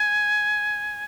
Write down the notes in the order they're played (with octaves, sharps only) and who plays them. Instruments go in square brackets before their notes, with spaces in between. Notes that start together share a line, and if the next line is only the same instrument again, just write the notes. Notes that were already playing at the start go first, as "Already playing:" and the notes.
Already playing: [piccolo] G#5